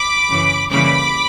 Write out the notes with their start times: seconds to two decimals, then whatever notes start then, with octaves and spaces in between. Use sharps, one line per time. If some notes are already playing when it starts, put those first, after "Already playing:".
Already playing: B5 D6
0.28 F#2 C#3 E3
0.71 C#3 E3 G3 A#3 B5 D6